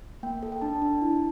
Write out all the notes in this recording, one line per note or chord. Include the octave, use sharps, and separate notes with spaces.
A#3 G5
A4
G5
D4 A5
D4
E4